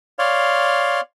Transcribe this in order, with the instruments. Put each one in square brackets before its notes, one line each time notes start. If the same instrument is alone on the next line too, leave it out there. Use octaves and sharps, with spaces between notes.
[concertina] C#5 D5 F5 C6